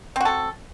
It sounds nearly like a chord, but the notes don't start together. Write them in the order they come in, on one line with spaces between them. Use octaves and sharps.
C4 F#4 A4